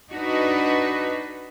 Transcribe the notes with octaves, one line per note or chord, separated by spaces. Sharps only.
D4 D#4 F#4 B4